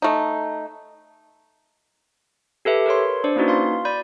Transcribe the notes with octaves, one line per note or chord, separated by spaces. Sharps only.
A3 D#4
G4 A4 B4 E5
A#4 B4 C#5 C6
D4 C5 D5
A#3 C#4 D#4 E4 F#4 B4
F5 C6
D5 B5 G6